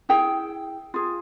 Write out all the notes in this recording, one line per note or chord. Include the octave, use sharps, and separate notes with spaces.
E4 G#4 G5
F4 G#4